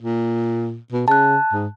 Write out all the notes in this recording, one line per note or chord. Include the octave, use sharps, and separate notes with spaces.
A#2
B2
C#3 A5 F#6
G#2